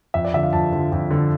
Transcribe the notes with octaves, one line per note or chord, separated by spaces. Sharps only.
F2 E5
D5
D3 F3 E5
F5
F2 A5
D3 F3
F2
D3 F3